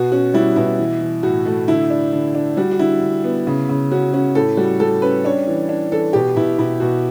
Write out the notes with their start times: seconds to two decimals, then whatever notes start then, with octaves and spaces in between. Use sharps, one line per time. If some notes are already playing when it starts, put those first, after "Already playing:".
Already playing: B2 F#4
0.12 C#4 F#4
0.34 G3 E4
0.56 B2 E4
0.79 E3
1.01 E3
1.23 A2 F#4
1.45 A3 F#4
1.68 D3 E4
1.90 D4
2.12 D3
2.35 D4
2.57 G3 F#4
2.71 F#4
2.79 D3 E4
3.01 D3
3.24 B3
3.47 C#3
3.69 C#3
3.92 C#4 F#4
4.13 C#4 F#4
4.35 A2 A4
4.57 G3 F#4
4.80 G3 A4
5.02 C#4 B4
5.25 D4 C#5
5.47 E3
5.69 D4
5.91 E3 A4
6.13 B2 G4
6.36 B2 E4
6.58 B2 E4
6.80 B2 F#4